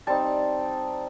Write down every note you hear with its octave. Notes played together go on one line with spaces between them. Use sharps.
G3 C4 D#4 A5